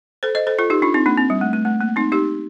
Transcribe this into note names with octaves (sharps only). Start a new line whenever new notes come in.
A4 C5
C5 D#5
A4 C5
F4 A4
D#4 G4
D4 F4
C4 D#4
A#3 D4
C4
G3
A3
A3
A3
A#3
C4 D#4
D#4 G4